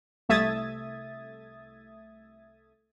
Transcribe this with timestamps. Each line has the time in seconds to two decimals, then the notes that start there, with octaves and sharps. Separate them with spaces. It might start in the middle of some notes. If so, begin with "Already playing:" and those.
0.29 C2 A3 E5 D#6 G#6 A6